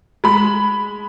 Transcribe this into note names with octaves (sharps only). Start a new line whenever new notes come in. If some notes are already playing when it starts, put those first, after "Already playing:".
G#3 B5